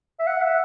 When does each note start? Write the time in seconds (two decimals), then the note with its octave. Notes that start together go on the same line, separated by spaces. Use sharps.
0.20 E5
0.27 F#5
0.42 E5